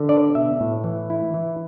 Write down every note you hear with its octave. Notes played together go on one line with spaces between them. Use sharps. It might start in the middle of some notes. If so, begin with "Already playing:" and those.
Already playing: D3
D4 D5
B2 E5
A2
E3
E4
E3